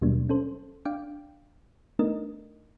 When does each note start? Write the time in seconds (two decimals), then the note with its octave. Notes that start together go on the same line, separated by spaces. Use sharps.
0.02 D#2 B2 F#3 G3 A#3 D4
0.29 C#4 A4 C5
0.85 D4 F5 G5 D6
1.99 A3 B3 D4 D#4 A#4 D#5